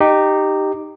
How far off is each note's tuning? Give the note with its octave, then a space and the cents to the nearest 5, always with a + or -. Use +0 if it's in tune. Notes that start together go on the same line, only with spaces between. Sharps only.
D#4 -15 G4 +0